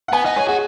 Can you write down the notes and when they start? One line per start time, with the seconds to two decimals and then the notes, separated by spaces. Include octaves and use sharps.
0.08 F#5
0.13 B3 G#5
0.25 D#4 F#5
0.36 G#4 C#5
0.48 F#4 G#4